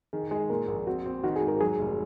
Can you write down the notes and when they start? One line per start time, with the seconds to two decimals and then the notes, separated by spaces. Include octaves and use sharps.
0.13 D#3 G#4
0.31 G#3 G#4
0.50 A#2 A#4
0.68 A#1
0.87 C4 F#4
1.06 C4
1.23 D#3 F#4
1.36 G#4
1.42 G#2
1.48 A#4
1.60 F#3 G#4
1.79 F1